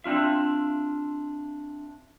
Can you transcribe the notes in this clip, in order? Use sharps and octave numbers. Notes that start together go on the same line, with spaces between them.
C4 D4 F4 E5